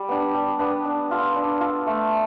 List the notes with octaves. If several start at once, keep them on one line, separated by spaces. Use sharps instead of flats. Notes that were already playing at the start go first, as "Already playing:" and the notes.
Already playing: G3
B3 D4
G3
B3 D4
D4
F4 A4
D4
F4 A4
A3